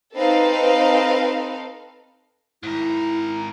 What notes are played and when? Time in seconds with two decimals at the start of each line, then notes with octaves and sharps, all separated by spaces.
0.16 C4 D#4 A4 B4 F5
2.63 G#2 E4 A#4